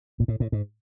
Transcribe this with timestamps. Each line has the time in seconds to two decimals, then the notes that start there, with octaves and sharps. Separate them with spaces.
0.20 A#2
0.28 A2
0.40 A2
0.52 G#2